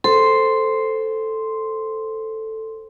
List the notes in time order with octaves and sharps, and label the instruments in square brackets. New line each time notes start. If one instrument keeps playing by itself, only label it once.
[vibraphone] A4 [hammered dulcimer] C5